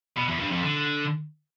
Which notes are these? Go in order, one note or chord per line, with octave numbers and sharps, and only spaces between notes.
B2
E2
G2
F2
D3